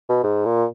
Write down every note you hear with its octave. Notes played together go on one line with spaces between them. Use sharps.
B2
G#2
A#2